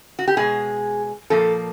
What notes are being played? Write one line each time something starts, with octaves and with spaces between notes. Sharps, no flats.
F#4
G4
B2 G#3 G#4
A#2 F3 A#3 A4